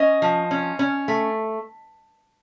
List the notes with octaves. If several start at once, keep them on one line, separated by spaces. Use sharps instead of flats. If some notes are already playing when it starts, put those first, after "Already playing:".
Already playing: C#4 D#5
F3
C#4
C#4
A3